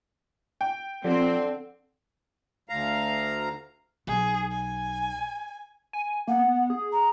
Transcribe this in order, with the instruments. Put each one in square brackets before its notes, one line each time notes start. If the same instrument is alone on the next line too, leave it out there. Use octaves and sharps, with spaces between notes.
[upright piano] G5
[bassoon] D3 [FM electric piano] F3 [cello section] C4
[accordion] D2 F5 A#5
[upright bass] B1 [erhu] G#4
[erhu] G#5
[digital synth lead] G#5
[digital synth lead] A#3 [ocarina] F#5
[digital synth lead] B3
G#4
[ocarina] A#5